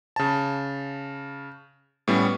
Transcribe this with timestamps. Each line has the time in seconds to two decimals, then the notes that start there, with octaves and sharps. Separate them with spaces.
0.16 C#3 A5
2.07 A2 G3 B3 C#4